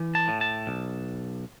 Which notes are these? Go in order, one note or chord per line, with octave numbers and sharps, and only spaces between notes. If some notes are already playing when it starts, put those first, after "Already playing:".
Already playing: E3
A5
A2
A5
B1